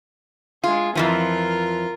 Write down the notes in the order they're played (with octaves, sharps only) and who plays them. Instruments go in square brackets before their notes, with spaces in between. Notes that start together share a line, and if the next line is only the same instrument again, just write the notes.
[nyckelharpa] G#3 G#4 [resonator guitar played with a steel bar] F4
[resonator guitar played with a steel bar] F2 E3 F3 [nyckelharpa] F4 A#4